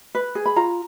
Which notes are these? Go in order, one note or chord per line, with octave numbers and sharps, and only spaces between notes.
B4
G#4
B5
F4 A#5